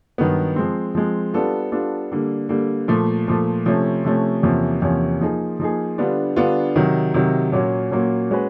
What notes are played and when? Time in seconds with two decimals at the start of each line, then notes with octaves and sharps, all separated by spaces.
0.18 G2 D#3 F#3 B3
0.56 F3 G#3 C4
0.95 F3 G#3 C4
1.34 G3 B3 D4 F4 A4
1.72 G3 B3 D4 F4 A4
2.12 D3 G3 A#3
2.49 D3 G3 A#3
2.88 A#2 F3 A3
3.28 A#2 F3 A3
3.66 C3 F3 A3 C#4
4.05 C3 F3 A3 C#4
4.43 E2 C3 F3 A#3 C#4
4.82 E2 C3 F3 A#3 C#4
5.21 F3 A#3 D#4 G#4
5.60 F3 A#3 D#4 G#4
5.98 D3 G3 B3 D4 F4
6.36 D3 G3 B3 D4 F4
6.76 C3 D#3 F#3
7.14 C3 D#3 F#3
7.52 A#2 F#3 A#3 C#4
7.91 A#2 F#3 A#3 C#4
8.31 G#3 C#4 F#4 B4